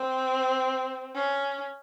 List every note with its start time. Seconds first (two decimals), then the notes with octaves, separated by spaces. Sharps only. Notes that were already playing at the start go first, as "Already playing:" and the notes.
Already playing: C4
1.16 C#4